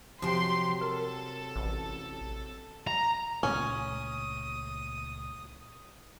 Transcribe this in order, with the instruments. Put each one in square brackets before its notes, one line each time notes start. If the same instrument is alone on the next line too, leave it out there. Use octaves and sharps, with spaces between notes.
[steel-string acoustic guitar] C3 F#3 [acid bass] F3 [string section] G4 C6
[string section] A4 [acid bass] A#4
[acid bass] A1
[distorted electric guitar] A#5
[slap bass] C#2 A#2 A3 [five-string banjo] C#4 [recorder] D#6